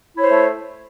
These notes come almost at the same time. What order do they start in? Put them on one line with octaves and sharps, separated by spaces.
E4 C#5 C5 A3